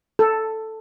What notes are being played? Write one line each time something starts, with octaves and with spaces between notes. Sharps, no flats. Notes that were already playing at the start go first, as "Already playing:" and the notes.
A4